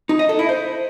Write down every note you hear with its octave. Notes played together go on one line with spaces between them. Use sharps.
D#4
D#5
A4
E4
C5